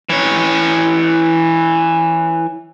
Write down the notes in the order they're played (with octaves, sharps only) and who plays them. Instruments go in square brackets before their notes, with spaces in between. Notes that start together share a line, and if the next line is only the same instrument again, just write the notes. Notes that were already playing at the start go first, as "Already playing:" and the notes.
[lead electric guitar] E3 C#5